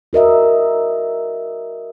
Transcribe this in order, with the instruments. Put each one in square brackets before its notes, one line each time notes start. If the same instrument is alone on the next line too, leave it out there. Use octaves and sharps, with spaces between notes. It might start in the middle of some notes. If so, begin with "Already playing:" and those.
[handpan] F#4 A#4 D#5 E5